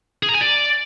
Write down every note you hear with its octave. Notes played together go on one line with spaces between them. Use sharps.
G#4
A#5
G#5
D5